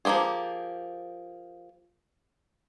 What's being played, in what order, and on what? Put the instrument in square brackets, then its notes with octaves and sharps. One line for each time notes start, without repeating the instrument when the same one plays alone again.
[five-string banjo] F3 A#3 C4 G4 G#4